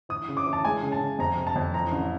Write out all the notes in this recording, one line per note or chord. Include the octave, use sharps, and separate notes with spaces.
E3 D#6
C#3
D6
E3
A5
G#3 G#5
C#3
A5
C#3
F2 A#5
C3
A5
F2
E3 A#5
A1